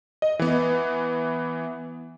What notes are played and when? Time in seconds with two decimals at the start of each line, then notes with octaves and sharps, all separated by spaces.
0.22 D#5
0.39 E3 B3